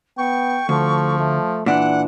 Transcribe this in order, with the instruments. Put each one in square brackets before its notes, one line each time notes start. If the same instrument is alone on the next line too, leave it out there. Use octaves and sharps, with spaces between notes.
[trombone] B3 [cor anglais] G5 [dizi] C#6
[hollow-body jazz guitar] D2 [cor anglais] F3 [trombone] A4
[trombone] A3
[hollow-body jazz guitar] A#2 D4 [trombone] E3 [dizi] F#5